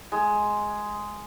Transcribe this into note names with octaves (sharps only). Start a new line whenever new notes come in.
G#3